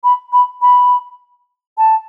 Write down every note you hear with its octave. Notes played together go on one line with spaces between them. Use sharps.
B5
B5
B5
A5